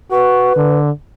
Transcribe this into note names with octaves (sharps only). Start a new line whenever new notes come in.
F#4 B4
D3